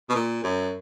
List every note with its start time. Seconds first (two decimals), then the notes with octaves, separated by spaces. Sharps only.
0.09 B2
0.15 A#2
0.44 F#2